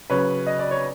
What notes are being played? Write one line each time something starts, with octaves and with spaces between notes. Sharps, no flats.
C#3 F#3 B4 C#5
D#5
D5
C#5